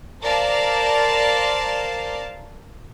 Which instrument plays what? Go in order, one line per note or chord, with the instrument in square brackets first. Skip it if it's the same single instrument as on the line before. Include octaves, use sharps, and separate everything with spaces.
[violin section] A#4 C5 D5 F5 A5